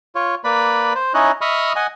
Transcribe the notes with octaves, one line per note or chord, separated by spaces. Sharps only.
F4 C#5
A#3 B4 D5 B5
C5
C#4 D#4 E4 C#5 D#5 F#6
D#5 E5 B5 C#6 D#6 F6
D#5 F#5 G#5